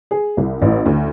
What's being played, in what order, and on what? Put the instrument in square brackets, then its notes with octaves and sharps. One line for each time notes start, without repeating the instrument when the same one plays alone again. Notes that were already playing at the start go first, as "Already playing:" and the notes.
[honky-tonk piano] G#4
C2
A1
D2